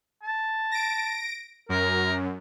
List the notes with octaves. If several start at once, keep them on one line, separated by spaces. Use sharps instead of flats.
A5
A#6 D7
F#2 A#4